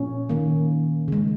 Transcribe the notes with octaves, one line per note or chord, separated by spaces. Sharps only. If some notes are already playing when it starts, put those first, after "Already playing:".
Already playing: A#2 F3 A#3 C#4
D#3 A#3
C#3 G#3